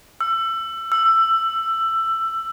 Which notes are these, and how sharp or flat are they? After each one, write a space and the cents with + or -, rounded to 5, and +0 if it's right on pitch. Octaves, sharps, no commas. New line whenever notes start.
E6 +25
E6 +15